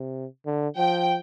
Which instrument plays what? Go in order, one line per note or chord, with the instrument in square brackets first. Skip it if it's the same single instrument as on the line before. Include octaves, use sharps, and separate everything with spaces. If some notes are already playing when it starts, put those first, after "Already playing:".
Already playing: [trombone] C3
D3
[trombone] F3 [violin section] G5